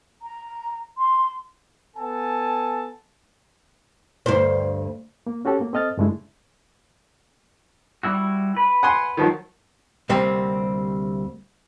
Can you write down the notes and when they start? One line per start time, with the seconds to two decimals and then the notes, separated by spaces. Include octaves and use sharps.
0.22 A#5
0.98 C6
1.97 B3 A4 G#5 A5
4.26 D2 G2 C5
5.27 A#3
5.45 C#4 F#4 G4 A4 C#5
5.61 A#3
5.73 C4 A4 D#5 F6 A6
5.98 G2 C#3 G#3 A3 D4 E4
8.03 G3 E4 F#4
8.57 B4
8.83 F#5 G#5 C6
9.17 D#3 F3 F#3
10.09 D2 C3 G3 A#3 C4